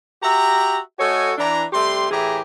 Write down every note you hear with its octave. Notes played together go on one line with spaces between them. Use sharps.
F#4 G4 E5 A#5
A3 F#4 A4 C#5 D#5 G#5
E3 D4 A#5
C3 G3 A3 G4 C6
A2 E3 G4 G#4 E5 A#5